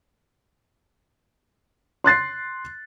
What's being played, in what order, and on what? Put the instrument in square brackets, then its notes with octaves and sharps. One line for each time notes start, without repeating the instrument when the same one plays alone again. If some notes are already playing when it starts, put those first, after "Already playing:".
[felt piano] C6 F#6 A6 C7